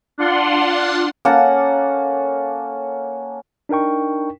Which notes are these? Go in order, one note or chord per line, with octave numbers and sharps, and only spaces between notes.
D4 F4 F#5 C6
A#3 C#4 A4 F#5 A5
D4 D#4 A#4 G5 C#6